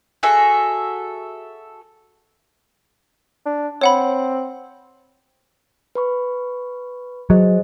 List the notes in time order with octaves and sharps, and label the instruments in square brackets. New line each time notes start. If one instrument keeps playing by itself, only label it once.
[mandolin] F#4 G#4 A4 E5
[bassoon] D4
[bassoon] C4 [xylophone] C#5 F#5 B5
[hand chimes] B4 B5 C#6
[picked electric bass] F#3 [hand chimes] G#4 C5 D#5